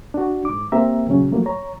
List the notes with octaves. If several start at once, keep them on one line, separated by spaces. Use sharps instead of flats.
D4 F#4
G#2 D6
A#3 C4 G4 E5 A#5
E2 A#2 C#3 F#3 C#4
F3 F#3 A3 A#3
C#5 A#5